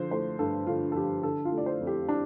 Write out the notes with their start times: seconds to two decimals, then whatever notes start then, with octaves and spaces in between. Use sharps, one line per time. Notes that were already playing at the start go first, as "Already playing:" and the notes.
Already playing: D3 F3 C5
0.11 A3 C5
0.39 G2 A4
0.67 D3 F4
0.92 A4
0.95 F3 G4
1.23 D3 A4
1.45 F4
1.52 A3
1.58 D5
1.66 C5
1.81 F2
1.87 G4
2.09 D4